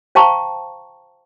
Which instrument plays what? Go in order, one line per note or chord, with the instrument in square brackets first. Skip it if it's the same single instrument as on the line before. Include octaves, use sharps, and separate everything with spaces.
[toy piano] C5 F5 G5 A5 A#5 C#6